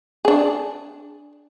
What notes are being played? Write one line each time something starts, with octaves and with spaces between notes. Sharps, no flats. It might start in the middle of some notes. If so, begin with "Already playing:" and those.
D4 G#4